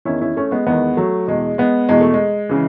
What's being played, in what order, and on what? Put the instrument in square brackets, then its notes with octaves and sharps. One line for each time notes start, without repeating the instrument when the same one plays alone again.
[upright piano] E2 D#3 C#4 E4
C#4 E4
A3 C#4
G#3 B3
E2 D#3 G#3 B3
F#3 A3
E2 B2 G#3
G#3 B3
E2 B2 G#3
A3
G#3
C#3 E3